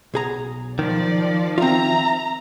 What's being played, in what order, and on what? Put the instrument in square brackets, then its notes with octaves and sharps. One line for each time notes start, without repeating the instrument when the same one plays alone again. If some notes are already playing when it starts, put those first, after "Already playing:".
[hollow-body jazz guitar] B1 G#4 A#5
[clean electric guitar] D#3 [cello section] F3 [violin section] D5
[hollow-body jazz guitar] C4 F4 [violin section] E5 A#5